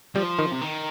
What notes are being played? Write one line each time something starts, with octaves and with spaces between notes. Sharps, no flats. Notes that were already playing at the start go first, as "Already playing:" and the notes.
F3 G3
D#3
C3
D#3